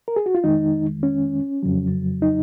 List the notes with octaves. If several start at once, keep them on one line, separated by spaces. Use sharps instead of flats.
A#4
G#4
F#4
F4
F2 D#3 G#3 D#4
C#4
F2 C#3 F#3
D#4